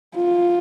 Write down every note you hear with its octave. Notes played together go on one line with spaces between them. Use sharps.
F4